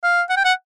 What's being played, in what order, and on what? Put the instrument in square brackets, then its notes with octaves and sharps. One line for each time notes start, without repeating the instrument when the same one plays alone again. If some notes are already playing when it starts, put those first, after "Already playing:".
[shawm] F5
F#5
G5
F#5